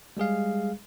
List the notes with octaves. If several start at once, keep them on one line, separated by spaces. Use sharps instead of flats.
G3 G#3 G#4 F5